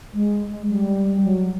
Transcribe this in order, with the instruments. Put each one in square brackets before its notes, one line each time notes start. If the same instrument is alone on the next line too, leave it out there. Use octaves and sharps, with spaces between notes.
[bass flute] G#3
G3
F#3